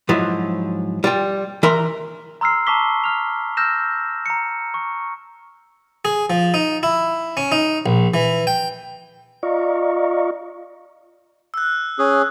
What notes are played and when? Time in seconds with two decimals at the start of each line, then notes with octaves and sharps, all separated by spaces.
0.09 G#2 F3 F#3 E4
1.04 G3 F4 G5
1.63 E3 A#4 E5 A#5 C6
2.41 A#5 C6 E6 F6 C7
2.67 A5 A#5 C#6 D6 B6 G7
3.04 F6 F7
3.57 E6 F6 G6 A#6 E7
4.26 A#5 C#7
4.74 C#6
6.05 G#4
6.30 F3
6.54 D#4
6.83 E4
7.37 C#4
7.52 D#4
7.86 A#1
8.14 E3
8.47 G5
9.43 F4 D5 D#5 F5 A#5 C#6
11.54 E6 F#6
11.99 C#4 G#4